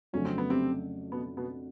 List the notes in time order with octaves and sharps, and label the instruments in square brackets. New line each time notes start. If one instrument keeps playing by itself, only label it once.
[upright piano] F2 C#3 F#3 A3 D4 [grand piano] C#4
[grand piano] C4
B3
C3 C4
B2 B3
B2 B3